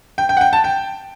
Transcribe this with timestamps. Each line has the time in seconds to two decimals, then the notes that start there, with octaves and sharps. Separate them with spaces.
0.18 G5
0.29 G5
0.37 F#5
0.41 G5
0.53 A5
0.64 G5